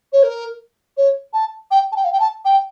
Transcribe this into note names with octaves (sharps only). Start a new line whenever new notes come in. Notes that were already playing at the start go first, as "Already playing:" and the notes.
C#5
A#4
C#5
A5
G5
A5
G5
F5
G5
A5
G5